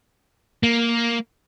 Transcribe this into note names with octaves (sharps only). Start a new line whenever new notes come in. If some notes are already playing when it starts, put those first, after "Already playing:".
A#3